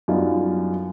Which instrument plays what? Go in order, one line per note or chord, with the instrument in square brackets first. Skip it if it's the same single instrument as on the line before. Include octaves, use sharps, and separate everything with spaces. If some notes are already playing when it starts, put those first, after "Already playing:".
[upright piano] F#2 G3 B3 D4 D#4 F4